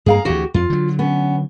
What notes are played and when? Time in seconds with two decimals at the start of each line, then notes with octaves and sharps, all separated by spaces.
0.06 G2 G#3 A#3 G#4 F5 A#5
0.25 D2 E3 F#4 G4
0.54 F2 F4
0.70 D3 F#3
0.99 B3 C#4